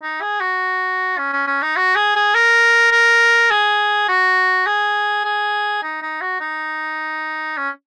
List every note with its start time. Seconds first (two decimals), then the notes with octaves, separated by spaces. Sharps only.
0.03 D#4
0.22 G#4
0.41 F#4
1.18 C#4
1.33 C#4
1.47 C#4
1.62 D#4
1.76 F#4
1.96 G#4
2.16 G#4
2.35 A#4
2.92 A#4
3.50 G#4
4.09 F#4
4.66 G#4
5.25 G#4
5.83 D#4
6.02 D#4
6.21 F#4
6.40 D#4
7.57 C#4